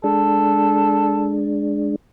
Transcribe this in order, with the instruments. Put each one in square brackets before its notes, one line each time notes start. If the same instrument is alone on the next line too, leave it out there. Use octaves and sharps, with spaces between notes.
[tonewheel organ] G#3 D4 [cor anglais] A4